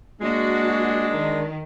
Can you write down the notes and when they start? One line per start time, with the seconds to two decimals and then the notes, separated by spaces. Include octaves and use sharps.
0.21 G#3 A#3 D4 F#4
1.10 D#3